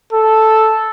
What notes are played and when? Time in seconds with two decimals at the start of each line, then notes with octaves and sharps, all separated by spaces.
0.13 A4